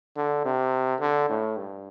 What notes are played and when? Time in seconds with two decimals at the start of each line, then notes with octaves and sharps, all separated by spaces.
0.16 D3
0.45 C3
1.01 D3
1.29 A2
1.57 G2